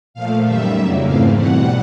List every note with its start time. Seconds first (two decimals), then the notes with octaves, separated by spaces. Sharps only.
0.14 A#2 F3 A3 F5
0.44 F#2 D#3 G3 E5
0.76 F2 C#3 F#3 A#3
1.06 G#2 E3 A3 C4 F5
1.37 E2 B2 G3 F#5